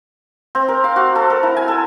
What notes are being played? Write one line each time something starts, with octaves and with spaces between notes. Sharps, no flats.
C4
A#4
F5
F#4
A4
A#4
E4
G#5
A4